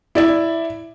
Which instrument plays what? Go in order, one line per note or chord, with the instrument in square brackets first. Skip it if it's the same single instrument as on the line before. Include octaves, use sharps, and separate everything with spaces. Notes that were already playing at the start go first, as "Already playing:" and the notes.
[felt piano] E4 D5 E5